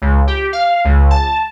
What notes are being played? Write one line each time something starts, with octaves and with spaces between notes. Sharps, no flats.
C#2
G4
F5
C#2
A5